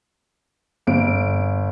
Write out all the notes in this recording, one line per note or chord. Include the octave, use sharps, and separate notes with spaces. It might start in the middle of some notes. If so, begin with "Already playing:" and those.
G1 D7